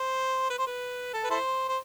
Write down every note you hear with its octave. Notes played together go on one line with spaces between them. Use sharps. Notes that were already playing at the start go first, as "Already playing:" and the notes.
Already playing: C5
B4
C5
B4
A4
B4
E4 A4 C5
C5